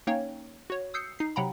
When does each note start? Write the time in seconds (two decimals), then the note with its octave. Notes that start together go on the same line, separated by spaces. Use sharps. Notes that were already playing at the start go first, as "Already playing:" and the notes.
0.07 A#3 C#4 D#4 C#5 F5 G5
0.70 F#4 C#5
0.94 D#6 E6 G6 C7 C#7
1.19 D#4 C7
1.36 C3 F#3 F#5 G5 A#5 B5